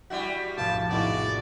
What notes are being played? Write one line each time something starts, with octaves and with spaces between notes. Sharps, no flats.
G3 E4 F#4
F1 A#1 A2 F5 A5
D#3 G#3 B3 E4 F#4 D5